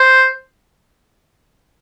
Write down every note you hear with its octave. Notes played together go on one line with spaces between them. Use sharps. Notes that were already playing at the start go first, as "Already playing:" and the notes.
Already playing: C5